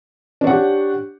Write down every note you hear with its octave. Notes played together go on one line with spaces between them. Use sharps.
D4 G4 C#5 F#5